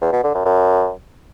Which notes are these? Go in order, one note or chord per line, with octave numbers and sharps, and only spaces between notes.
E2
B2
D3
F#2
F#2